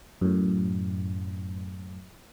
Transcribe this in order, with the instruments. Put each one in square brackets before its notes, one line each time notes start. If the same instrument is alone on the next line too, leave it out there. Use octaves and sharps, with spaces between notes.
[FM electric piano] F#2 A2